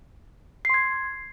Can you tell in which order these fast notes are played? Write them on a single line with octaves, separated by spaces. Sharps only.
C7 C6 G#6